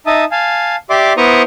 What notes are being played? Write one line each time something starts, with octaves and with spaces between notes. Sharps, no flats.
D#4 E5 A5 D#6
F5 G#5 A5
G4 D5 E5 C6 D6
B3 E4 C5 A#5 C#6 D#6